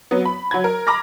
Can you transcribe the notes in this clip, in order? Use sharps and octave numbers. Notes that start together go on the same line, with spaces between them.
F#3 B3
B5
F#3 B5 G#6
A#4
A#5 B5 D6 F6 A#6